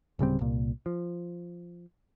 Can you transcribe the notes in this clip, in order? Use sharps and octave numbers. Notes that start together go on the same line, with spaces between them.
D1 C#3 G3 C4
C2 A#2
F3